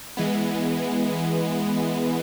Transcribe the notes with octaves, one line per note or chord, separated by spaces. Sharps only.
E3 G#3 B3